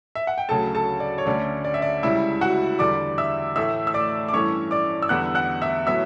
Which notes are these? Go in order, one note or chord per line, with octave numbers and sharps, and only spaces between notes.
E5
F#5
G5
D2 C#3 F#3 A4 A5
A4 A5
D5
C#5
D2 D3 A3 C#4 D5
D5
E5
D5
C#2 C#3 G3 E4 E5
F#4 F#5
E2 D3 G3 D5 D6
E5 E6
A2 E3 A3 E5 E6
E6
D5 D6
D6
G2 E3 A3 C#4 C#5 C#6
D5 D6
E6
E2 D3 G3 B3 F#5 F#6
F#5 F#6
E5 E6
A2 F#3 B3 E5 E6